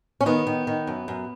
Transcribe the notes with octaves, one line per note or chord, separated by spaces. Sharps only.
C#4
D#3 B3
D#3
D#3
F#2
F#2